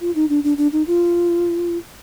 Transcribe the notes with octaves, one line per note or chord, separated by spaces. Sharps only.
F4
D#4
D4
D4
D4
D#4
F4